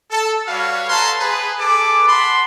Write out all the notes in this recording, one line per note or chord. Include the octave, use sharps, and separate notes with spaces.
A4
G3 F#4 B4 C#5 F5
A4 B4 C#5 A5 A#5 C6
G#4 B4
G#4 A4 B4 D6
F#5 A5 B5 C6